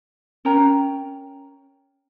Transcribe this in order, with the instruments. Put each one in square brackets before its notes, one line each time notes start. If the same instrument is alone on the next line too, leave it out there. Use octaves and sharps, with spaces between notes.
[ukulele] C#4 A#4 G5 A#5